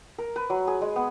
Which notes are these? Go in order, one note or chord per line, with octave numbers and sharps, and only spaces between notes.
A#4
B4
F#3
G#4
G#3
B3